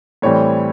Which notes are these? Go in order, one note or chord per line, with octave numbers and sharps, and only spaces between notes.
A2 E3 G3 C4 C#5